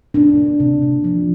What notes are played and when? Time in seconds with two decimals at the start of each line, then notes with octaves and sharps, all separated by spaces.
0.14 C3 D4
0.37 A#3
0.60 C3
0.82 C3
1.04 F3